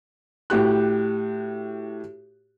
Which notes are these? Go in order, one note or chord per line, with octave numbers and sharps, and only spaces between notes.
A2 F#4 G4 F#6